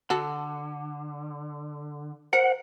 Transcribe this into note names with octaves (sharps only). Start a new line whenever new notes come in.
D3 F#4 A4
A#4 C5 F#5